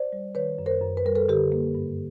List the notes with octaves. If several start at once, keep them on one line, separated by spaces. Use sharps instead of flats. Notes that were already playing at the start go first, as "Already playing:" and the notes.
Already playing: C5 D5
G3
D#3 B4 C#5
F#2
A#4 C5
F#2
B4
G3 A#4
A4 B4
D3 G4 A4
A#3
G2